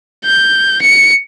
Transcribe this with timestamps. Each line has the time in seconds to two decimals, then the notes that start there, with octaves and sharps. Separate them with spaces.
0.25 G6
0.82 C#7